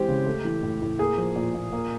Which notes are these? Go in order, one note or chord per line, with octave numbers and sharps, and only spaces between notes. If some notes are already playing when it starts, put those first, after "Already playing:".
Already playing: E3 G#3 C4 G4
C#3
A3
E3
A2
A2
A#3 G#4
F3
A#2
A#2
A#3